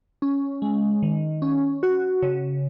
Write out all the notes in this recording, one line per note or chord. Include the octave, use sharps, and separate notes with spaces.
C#4
G#3
D#3
C#4
F#4
C#3